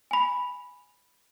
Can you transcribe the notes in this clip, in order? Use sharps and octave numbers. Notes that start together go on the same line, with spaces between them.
G#5 B5